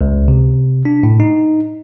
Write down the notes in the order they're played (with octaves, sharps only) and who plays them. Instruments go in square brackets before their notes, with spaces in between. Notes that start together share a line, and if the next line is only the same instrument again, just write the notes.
[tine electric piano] C#2
C3
D4
A2
D#4